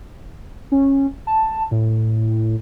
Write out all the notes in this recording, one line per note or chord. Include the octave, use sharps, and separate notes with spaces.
C#4
A5
A2